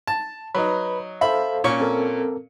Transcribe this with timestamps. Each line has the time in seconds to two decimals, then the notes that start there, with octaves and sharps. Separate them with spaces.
0.07 A5
0.55 F#3 D#4 B4 B5
1.21 A4 C5 E5 F5 B5
1.64 A#2 C#4 C#6
1.80 C4 A4 A#4